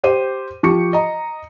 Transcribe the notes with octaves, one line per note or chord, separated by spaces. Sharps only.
G4 C5 D#7
F3 G4 C#6 C#7
D#5 A#5